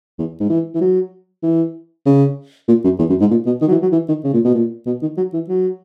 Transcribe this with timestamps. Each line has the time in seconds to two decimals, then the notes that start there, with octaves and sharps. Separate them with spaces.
0.19 E2
0.40 G#2
0.50 E3
0.75 E3
0.81 F#3
1.43 E3
2.06 C#3
2.68 A#2
2.84 F#2
2.99 E2
3.10 F#2
3.21 G#2
3.31 A#2
3.46 B2
3.61 D#3
3.68 F#3
3.71 E3
3.82 F#3
3.92 E3
4.08 D#3
4.24 C#3
4.34 A#2
4.45 B2
4.55 A#2
4.86 B2
5.02 D#3
5.17 F#3
5.33 E3
5.49 F#3